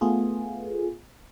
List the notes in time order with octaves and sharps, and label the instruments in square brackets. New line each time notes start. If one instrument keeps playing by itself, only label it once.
[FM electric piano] A3 B3 F4 G#4